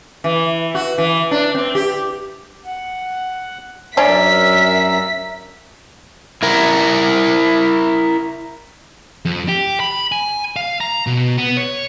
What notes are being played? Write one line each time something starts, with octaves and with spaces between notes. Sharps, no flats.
E3
F#4
E3
D4
C4
G4
F#5
F#2 C#4 D4 A#4 E5 B6
E4 A#4
F2
G4
B5
G#5
F5
A#5
B2
B3
C#5